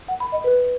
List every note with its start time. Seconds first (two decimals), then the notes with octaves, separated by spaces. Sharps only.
0.08 F#5
0.20 B5
0.32 D#5
0.44 B4